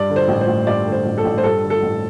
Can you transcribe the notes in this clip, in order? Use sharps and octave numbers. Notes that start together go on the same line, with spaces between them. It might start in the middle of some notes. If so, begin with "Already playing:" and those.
Already playing: G2 D5
D3
C5
A1
C5
A1
G2 D5
D3
C5
A1
A4
A1
C5
G2 A4
D3
A4
A1